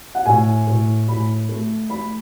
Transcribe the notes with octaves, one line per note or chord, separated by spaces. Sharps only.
F#5
A2 G#5
A2
A2 B5
A3
A3 B5